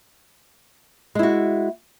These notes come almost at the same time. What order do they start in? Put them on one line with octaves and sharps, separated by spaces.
G#3 E4 F#4